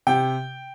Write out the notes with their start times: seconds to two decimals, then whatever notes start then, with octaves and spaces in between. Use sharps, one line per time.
0.07 C3 G5